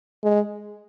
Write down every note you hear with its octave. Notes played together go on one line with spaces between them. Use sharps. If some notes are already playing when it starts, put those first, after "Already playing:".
G#3